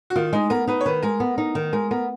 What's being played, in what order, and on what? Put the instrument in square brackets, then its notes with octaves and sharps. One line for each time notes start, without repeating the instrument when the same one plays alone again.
[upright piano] F#4
[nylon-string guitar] D#3 [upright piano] F4
[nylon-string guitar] G#3 [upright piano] D#4
[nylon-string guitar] B3 [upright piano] A#4
[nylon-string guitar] D#4 [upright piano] B4
[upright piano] C#5
[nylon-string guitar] D#3 [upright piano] B4
[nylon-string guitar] G#3 [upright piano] A#4
[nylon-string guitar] B3
D#4
D#3
[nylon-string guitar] G#3 [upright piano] A#4
[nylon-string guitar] B3 [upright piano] A#4